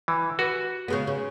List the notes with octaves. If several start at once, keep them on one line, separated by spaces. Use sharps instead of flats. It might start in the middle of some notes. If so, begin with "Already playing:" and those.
E3
F#4 B4
C#3 G#3 B3
C#3